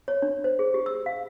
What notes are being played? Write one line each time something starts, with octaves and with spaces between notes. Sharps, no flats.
C#5
D4
C5
G#4
G4
E6
F5